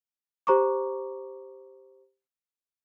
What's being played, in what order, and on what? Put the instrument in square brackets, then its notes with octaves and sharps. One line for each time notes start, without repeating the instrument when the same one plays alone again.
[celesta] G4 C5 A#5 C#6 D6